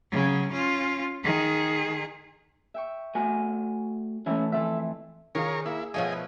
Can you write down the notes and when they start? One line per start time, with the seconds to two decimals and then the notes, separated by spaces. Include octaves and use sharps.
0.12 C#3 F#3
0.52 C#4 F4
1.24 D#3 G#4
2.74 E5 G5 C#6
3.15 A3 F#4 G#5
4.26 E3 A3 C#4 E4 A4
4.52 F2 E3 A4 E5
5.35 D#3 F4 G#4 A#4 C#5
5.66 A#3 E4
5.94 B2 F3 A3 F4 G#4 C#5 D#5 F5
6.12 B4